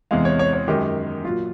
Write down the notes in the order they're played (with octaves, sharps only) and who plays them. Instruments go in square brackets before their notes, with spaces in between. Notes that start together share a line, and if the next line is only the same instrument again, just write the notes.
[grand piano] E2 C3 E3 G#3 F5
C#5
C#5
C#5
F#2 D#3 G#3 G4
A#2 F#3 F4